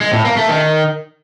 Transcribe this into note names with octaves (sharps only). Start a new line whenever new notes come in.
G#3
A2
A#3
A3
D#3